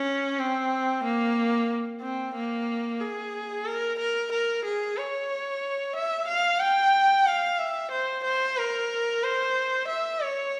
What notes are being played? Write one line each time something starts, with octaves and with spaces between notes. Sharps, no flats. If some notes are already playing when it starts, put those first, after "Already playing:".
Already playing: C#4
C4
A#3
C4
A#3
G#4
A#4
A#4
A#4
G#4
C#5
E5
F5
G5
F5
E5
C5
C5
A#4
C5
E5
C#5